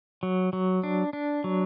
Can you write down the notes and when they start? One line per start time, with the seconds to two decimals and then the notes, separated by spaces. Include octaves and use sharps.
0.23 F#3
0.53 F#3
0.83 D4
1.13 D4
1.44 F#3